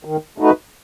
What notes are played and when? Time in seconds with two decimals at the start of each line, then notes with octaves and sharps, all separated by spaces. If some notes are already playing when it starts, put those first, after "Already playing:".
0.05 D#3
0.38 A3 D#4 F#4 B4